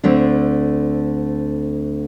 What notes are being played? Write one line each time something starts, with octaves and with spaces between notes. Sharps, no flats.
D2 D3 A3 C4 D4